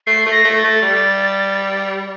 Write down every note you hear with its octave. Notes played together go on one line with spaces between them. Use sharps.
A3 C7
A3
A#6
A3
A6
A3
G3